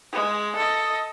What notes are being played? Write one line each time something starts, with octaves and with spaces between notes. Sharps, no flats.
G#3
A4 D#5